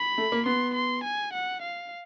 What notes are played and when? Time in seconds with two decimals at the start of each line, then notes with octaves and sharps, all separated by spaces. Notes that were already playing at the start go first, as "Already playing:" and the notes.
Already playing: B5
0.18 A3
0.32 A#3
0.46 B3 C6
0.75 C6
1.04 G#5
1.33 F#5
1.62 F5